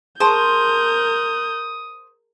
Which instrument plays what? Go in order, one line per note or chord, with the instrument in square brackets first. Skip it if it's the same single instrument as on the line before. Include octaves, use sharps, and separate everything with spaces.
[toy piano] G#4 A5 C#6 [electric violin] A#4 G6 [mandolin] C5 [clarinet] D#6